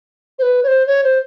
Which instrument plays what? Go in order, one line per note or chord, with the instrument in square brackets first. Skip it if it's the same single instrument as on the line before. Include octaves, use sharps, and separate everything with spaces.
[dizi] C5
B4
C#5
C5
C#5
C5